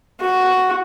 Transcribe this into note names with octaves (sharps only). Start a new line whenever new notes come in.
F#4